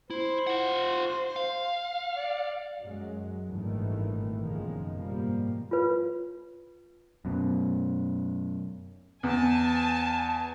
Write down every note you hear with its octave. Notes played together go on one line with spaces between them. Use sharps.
E4 C5
F4 F#5
F5
D5
F#2 F#3 G#3
G#1 G2 A#2 D#3 E3 A3
F#1 F#2 B2 D#3 F3 G#3
G#2 B2 F3 G3 A#3
F4 B4
F#2 B2
E2 G#5 A5